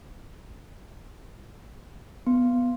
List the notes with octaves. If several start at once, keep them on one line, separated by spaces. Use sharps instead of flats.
B3